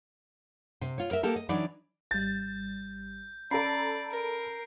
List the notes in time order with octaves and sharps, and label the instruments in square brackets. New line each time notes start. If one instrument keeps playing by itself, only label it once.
[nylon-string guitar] C3
F4 C#5
A#4 D#5 E5
A#3 G4 A4 A#4
D#5
E3 F#3 D4 D#4 D5
[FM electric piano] G#1 G3 [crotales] G6 [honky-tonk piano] A6
[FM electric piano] C#4 [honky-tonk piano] A4 A#5 B5 [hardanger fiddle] D5 [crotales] C7 D7
[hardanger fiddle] A#4